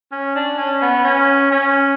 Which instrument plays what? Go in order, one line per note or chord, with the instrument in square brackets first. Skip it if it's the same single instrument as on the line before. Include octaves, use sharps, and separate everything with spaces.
[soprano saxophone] C#4
D4
C#4
B3
C#4
C#4